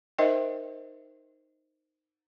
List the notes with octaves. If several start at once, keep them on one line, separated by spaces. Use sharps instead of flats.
D#4 A#4 C5 D#5 E5 G5